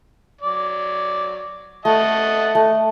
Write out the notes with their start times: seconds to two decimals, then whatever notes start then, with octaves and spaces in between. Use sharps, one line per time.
0.41 F#3 D5
1.85 A3 D#5 F#5 A5
2.55 A3